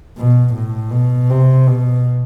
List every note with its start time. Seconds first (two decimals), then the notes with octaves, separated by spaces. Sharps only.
0.17 B2
0.55 A2
0.92 B2
1.30 C3
1.67 B2